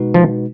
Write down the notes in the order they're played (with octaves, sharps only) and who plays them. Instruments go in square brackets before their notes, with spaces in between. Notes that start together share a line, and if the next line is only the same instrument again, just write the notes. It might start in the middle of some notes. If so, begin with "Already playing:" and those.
Already playing: [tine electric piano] B2 G#3 D#4 F#4 B4
[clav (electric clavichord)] F3